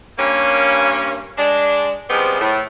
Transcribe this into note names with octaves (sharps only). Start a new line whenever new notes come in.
G2 A#3 C#4
G#3 D4
C#3 F3 G3 G#3 B3 C4
A2